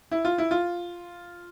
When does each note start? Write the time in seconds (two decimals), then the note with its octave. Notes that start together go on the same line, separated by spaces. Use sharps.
0.11 E4
0.25 F4
0.38 E4
0.51 F4